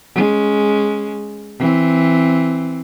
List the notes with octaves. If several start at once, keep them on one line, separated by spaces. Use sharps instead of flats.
G#3 C#4
E3 C4